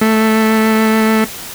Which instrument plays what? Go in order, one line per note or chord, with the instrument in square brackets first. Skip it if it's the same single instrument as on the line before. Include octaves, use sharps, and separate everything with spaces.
[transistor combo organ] A3